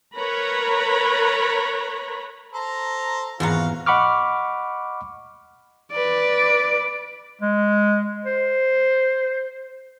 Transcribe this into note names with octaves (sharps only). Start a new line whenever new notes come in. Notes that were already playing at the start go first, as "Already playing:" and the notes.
A#4 B4 C#5 A#5 B5
A4 C5 A#5
G#1 E2 F4 F#4 F5 F#5 A#5
D#5 F#5 B5 C#6 D6 F6
B4 D5
G#3
C5